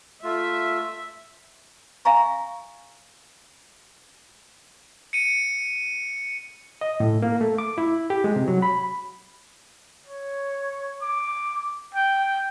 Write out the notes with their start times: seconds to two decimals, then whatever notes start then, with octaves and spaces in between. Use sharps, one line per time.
0.23 A3 F4 E5
2.05 E5 F5 G#5 A#5 C#6
5.13 C#7 D#7
6.81 D#5
7.00 A2
7.22 A#3
7.41 A3
7.58 D6
7.78 E4
8.10 G4
8.24 G#3
8.36 C3
8.48 F#3
8.62 B5
10.07 C#5
11.02 D6
11.95 G5